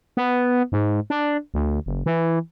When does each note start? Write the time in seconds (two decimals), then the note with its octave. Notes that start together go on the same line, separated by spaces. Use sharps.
0.17 B3
0.72 G#2
1.10 D4
1.54 D2
1.86 F#1
2.06 E3